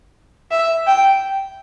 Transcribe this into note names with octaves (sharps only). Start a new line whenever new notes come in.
E5
G5